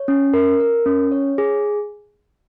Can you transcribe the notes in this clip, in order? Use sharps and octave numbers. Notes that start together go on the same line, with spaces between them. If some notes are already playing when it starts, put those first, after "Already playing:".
Already playing: C#5
C#4
A#4
A#4
C#4
C#5
G#4